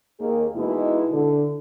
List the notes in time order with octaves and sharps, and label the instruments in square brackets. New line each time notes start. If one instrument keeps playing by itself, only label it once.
[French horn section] D#2 A#3 G#4
B2 E3 G#3 D#4 E4
D3